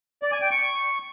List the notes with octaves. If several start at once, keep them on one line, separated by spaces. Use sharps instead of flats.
D5
G#5
G5
C#6